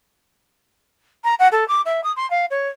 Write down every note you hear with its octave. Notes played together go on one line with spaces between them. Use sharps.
A#5
F#5
A4
D6
E5
D#6
C6
F5
C#5